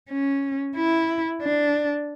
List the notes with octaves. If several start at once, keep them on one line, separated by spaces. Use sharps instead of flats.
C#4
E4
D4